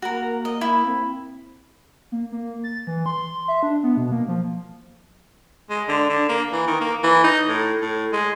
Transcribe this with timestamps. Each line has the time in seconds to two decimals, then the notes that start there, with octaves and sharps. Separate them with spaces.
0.02 A#3 F#4 A#4
0.45 D#5
0.61 E4
0.86 C4
2.12 A#3
2.32 A#3
2.64 A6
2.87 E3
3.06 C6
3.48 E5
3.63 D4
3.83 B3
3.97 B2
4.12 A#3
4.28 F3
5.70 G#3
5.88 D3
6.09 D3
6.29 A#3
6.52 E3
6.67 D#3
6.81 A#3
7.03 E3
7.24 D#4
7.48 A2
7.81 A2
8.13 G#3